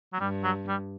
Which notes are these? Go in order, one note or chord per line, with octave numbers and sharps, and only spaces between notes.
F#3
G2 G3
F#3
G3